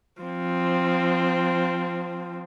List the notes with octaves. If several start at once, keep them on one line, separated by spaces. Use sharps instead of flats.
F3 C4